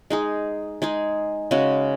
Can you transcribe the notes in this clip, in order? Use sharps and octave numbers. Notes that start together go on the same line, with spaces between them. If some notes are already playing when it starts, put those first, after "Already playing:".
G#3 D#4 G#4
G#3 D#4 G#4
C#3 G#3 C#4 F#4